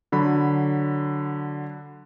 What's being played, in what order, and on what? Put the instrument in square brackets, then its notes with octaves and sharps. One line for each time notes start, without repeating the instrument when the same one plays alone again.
[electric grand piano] D3 F#3 B5